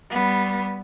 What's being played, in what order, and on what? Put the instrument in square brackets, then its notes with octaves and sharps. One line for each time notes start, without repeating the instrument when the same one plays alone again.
[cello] G3 B3